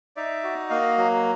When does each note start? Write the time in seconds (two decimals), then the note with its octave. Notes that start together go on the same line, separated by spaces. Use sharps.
0.16 D#4 D5 E5
0.43 F#4
0.70 A#3 D#5 F5
0.98 F#3